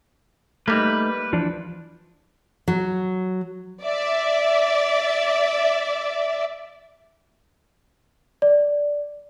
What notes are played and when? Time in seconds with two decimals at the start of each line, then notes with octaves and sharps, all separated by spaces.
0.68 G3 A3 A#3 D#4 B4
1.33 E3 F3 D4
2.68 F#3
3.83 D5 E5
8.42 D5